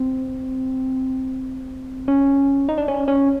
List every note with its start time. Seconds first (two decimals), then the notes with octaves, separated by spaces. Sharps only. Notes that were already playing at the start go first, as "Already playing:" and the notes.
Already playing: C4
2.08 C#4
2.69 D#4
2.78 D4
2.88 C#4
3.08 C#4